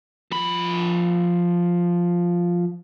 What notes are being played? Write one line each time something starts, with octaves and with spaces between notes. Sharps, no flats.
F3 B5